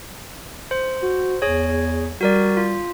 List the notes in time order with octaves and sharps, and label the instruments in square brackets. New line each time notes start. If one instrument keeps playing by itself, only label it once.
[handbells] C5
[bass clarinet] F#4
[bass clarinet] E2 [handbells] G#4 C#5
[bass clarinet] G3 [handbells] F#4 A#4 D5
[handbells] F4